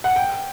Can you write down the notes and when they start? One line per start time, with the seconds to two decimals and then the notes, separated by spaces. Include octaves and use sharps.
0.04 F#5
0.16 G5